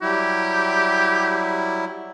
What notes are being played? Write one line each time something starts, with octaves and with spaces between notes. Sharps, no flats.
F#3 G3 E4 G4